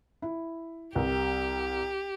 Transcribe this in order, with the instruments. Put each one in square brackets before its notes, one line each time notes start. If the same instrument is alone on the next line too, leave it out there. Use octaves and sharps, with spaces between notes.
[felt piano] E4
[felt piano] C2 A#4 [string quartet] G4